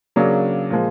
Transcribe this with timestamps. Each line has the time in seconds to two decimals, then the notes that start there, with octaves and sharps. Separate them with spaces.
0.16 C#3 F#3 A#3 D4
0.70 A#2 F3 G#3